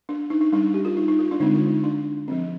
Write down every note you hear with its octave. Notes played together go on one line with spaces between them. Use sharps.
D4
D#4
D#4
G3 D4 D#4
G4
F4
D#4
D#4
F4
D4
D3 G#3 C4 D#4
F4
D#4
D4
F3 C4